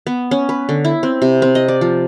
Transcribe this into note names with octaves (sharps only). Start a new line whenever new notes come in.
B3
C#4
B4
D3
E4
C4
C3
C4
D#5
D5
F3